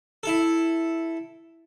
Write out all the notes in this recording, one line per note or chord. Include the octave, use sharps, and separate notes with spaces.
E4 A4